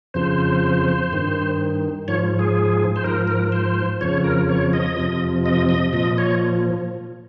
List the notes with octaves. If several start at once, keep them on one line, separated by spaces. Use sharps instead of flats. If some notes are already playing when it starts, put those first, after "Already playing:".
F2 C#3 F3 C5
G2 D#3
G#2 F3 C#5
G#4
C5
G#2 F3 A#4
A#4
C5
F2 C#3 F3 C#5
A#4
C#5
D#5
F2 C3 F3
D#5
D#5
A#2 F3 D#5
C#5